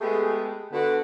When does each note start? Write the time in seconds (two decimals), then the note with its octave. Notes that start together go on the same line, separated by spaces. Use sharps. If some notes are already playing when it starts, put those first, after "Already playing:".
0.01 G#3 A3 B3 G4 G#4
0.73 D3 B3 F#4